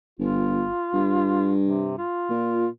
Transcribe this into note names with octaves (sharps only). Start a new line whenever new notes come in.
G1 F4
G2
C3
F4
A#2